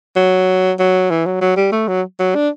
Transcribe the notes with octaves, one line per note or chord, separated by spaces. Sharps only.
F#3
F#3
E3
F#3
F#3
G3
A3
F#3
F#3
D4